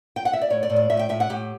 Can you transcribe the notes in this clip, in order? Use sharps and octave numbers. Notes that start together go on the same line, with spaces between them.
G5
F#5
E5
D5
A2 C#5
D5
A2
D5
A2 E5
G5
A2 E5
F#5
A2 G4